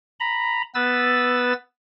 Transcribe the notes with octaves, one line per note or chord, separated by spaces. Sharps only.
A#5 B5
B3 B4 E6 A6